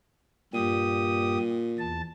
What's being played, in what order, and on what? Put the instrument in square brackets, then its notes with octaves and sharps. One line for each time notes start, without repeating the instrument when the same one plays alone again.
[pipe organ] G2 G4 D#6 [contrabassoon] A#2
[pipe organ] E2 A5